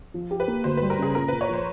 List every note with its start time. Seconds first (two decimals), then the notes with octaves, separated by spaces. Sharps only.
0.14 F3
0.31 G4
0.40 B4
0.48 A#3
0.64 D2 C5
0.77 B4
0.82 G3
0.90 A#4
0.99 C#3 G#4
1.15 A#2 A#4
1.28 A#2 B4
1.41 C#5
1.49 F3 C5